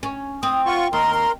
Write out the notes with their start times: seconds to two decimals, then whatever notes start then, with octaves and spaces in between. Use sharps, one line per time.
0.03 C#4
0.43 C4 D#6
0.66 F4 F#5 C#6
0.93 D#2 A#4 A#5 C6
1.14 A#5